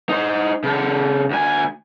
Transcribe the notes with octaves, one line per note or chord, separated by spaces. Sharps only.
D#4 C5
C#3 A4
D2 G#5